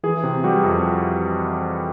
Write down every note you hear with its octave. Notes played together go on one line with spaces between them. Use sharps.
E3 G#4
C3
G3 F#4
F2